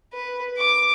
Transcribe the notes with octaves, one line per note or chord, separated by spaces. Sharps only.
B4
D6